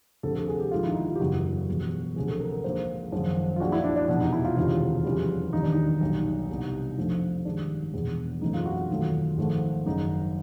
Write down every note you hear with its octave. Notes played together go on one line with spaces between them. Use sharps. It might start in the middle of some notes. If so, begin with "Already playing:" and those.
D2 C3 F3 A4
A4
G#4
G4
A#1 G#2 D#3 G#3 F4
E4
D#4
E4
F4
G4
F#1 E2 C#3 F#4
E1 E2 B2 G3
D2 C3 F3 G#4
A4
A#4
A#4
A#1 G#2 F3 A#3 C5
G#1 F#2 C#3 F3
F4
A#1 A#2 F3 G#3 F#4
E4
D4
D4
F1 E2 B2 D4
D#4
E4
F4
E1 D2 C3 D#3 F4
F2 C#3 E3 G3
E1 D#2 D#3 G3 D#4
D4
D#4
B1 A#2 G3
C2 B2 G3
F2 D3 F3 A3
G#1 G2 D#3 G#3 D4
E1 E2 B2
F#2 C#3 E3 A3 C4 D#4
F4
F#4
F4
E1 D#2 D#3 F#3 A3
G#1 G#2 F3 A3
G#1 F#2 C#3 D#4